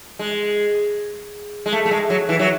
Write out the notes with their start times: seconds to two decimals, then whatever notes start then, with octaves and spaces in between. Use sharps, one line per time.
0.19 G#3
1.66 G#3
1.73 A3
1.85 A3
1.91 G#3
2.10 F#3
2.29 E3
2.39 F#3